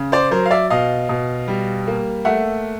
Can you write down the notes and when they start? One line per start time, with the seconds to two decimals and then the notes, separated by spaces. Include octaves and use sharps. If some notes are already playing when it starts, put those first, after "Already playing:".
Already playing: C#3
0.12 C5 D5
0.31 F#3 A#4 C5
0.46 F5
0.51 D5 E5
0.70 B2 D#5 F5
1.09 B2
1.48 G3
1.87 A#3
2.25 A3 E5 F#5